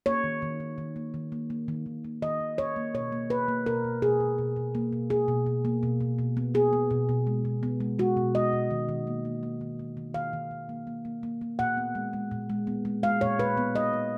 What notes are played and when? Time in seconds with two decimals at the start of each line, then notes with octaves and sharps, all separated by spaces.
0.06 A#3 C#5
0.24 D#3
0.42 D#3
0.60 D#3
0.78 D#3
0.96 A#3
1.14 D#3
1.32 A#3
1.50 A#3
1.68 D#3
1.86 D#3
2.05 A#3
2.22 D#3 D#5
2.41 D#3
2.58 D#3 C#5
2.76 A#3
2.94 B2 C#5
3.12 A#3
3.30 A#3 B4
3.48 A#3
3.66 B2 A#4
3.84 B2
4.02 B2 G#4
4.20 B2
4.38 B2
4.56 B2
4.75 A#3
4.93 B2
5.10 B2 G#4
5.28 B2
5.46 B2
5.65 A#3
5.83 B2
6.01 B2
6.19 B2
6.37 B3
6.54 B3 G#4
6.73 B3
6.91 B2
7.09 B2
7.27 G#3
7.45 B2
7.63 B3
7.80 G#3
7.99 G#3 F#4
8.17 B2
8.35 G#3 D#5
8.53 B2
8.71 D#3
8.89 D#3
9.07 A#3
9.25 A#3
9.43 A#3
9.61 D#3
9.79 D#3
9.97 D#3
10.14 D#3 F5
10.33 D#3
10.51 D#3
10.69 A#3
10.87 A#3
11.05 A#3
11.23 A#3
11.41 A#3
11.59 A#2 F#5
11.77 B3
11.95 G#3
12.13 G#3
12.31 A#2
12.50 G#3
12.67 B3
12.85 G#3
13.03 G#3 F5
13.21 A#2 C#5
13.39 A#2 B4
13.57 B3
13.75 G#3 D#5
13.93 B3